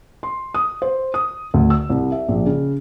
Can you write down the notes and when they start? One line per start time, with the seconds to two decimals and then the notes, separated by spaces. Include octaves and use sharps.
0.23 C6
0.54 D#6
0.82 C5
1.14 D#6
1.54 D2
1.70 E6
1.90 C2
2.12 E5
2.28 A#1
2.46 C#3